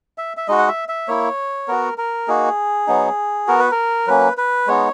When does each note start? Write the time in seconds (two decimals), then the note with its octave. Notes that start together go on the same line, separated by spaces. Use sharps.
0.18 E5
0.37 E5
0.48 G#3 D#4 F#4 D#5
0.58 F#5
0.68 E5
0.89 E5
1.08 A#3 E4 C#5
1.68 B3 F#4 A#4
1.98 A#4
2.28 A#3 D#4 F#4 G#4
2.87 F#3 B3 D#4
3.47 B3 F#4 A#4
3.59 B4
3.71 A#4
4.07 F#3 A#3 C#4 B4
4.38 B4
4.67 G#3 B3 D#4 C#5